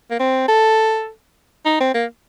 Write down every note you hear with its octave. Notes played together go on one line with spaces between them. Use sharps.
A#3
C4
A4
D#4
C4
A#3